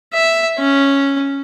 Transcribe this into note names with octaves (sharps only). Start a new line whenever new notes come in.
E5
C#4